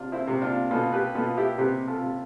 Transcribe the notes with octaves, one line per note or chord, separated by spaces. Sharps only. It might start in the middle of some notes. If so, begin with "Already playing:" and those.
Already playing: C3 D4 F4
C4 E4
C3
D4 F4
B2 F4 A4
G4 B4
B2 F4 A4
E4 G4
C3 G4 B4
F4 A4
C3